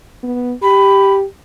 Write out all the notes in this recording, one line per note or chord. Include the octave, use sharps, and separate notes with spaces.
B3
G4 B5